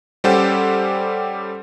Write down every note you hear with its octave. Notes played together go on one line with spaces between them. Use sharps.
G3 C#4 G4 A4 C5 F#5